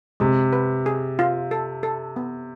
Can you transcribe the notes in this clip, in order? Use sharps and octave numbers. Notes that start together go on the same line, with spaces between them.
C3 G#3
B4
G#4
F4
A4
A4
B3